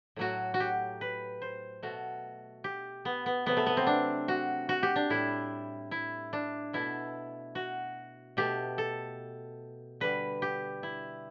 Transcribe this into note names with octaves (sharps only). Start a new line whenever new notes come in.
A2 F#3 A3 F#4
F#4
G4
B4
C5
B2 A3 F#4
G4
B3
B3
C3 F#3 A3 B3
A3
B3
C4
D4
F#4
F#4
G4
D4
A2 G3 E4
E4
D4
B2 A3 E4
F#4
B2 A3 G4
A4
D3 G3 B4
G4
E4